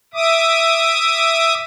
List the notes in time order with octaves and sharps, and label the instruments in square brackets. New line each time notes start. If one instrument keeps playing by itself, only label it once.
[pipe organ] E5 D6 D#6